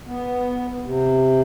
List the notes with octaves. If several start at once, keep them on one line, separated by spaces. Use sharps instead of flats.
B3
C3